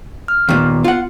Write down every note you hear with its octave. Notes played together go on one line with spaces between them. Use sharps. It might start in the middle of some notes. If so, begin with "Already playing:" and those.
F6
D#2 A#2 B3
F4 F#5